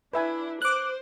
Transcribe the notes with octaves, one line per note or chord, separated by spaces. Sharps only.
D4 E4 B4 E5 G#5
C5 D6 F#6